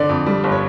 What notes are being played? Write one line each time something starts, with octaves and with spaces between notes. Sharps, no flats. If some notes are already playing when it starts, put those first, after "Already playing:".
Already playing: D3 D5
F2
G3
G1
C#5